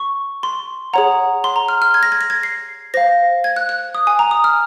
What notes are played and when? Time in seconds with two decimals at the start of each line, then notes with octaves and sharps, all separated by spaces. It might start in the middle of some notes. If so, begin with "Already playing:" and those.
Already playing: C#6
0.43 C6
0.93 G#4 C#5 F#5 A#5
1.44 C6
1.56 A#5
1.69 F6
1.82 F6
1.94 G#6
2.03 A#6
2.12 G#6
2.21 A#6
2.30 G#6
2.43 C7
2.94 C5 F5 A#6
3.44 G#6
3.56 F#6
3.69 F#6
3.95 D#6
4.07 G#5
4.19 A#5
4.31 D#6
4.44 F6